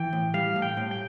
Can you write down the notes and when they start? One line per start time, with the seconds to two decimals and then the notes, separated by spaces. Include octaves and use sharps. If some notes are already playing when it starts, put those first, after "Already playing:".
Already playing: E3 G5
0.13 A2
0.34 G3 F5
0.56 A2
0.62 G5
0.77 A2
0.91 G5